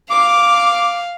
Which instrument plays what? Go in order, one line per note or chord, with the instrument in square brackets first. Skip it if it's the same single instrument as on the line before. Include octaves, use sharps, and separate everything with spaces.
[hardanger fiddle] F5 [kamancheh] D6